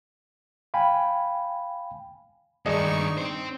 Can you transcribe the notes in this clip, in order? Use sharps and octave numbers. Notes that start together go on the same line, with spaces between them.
F5 G5 G#5 B5
G2 D#3 D4 D#4 G#4 D#5 C#6
C4 C5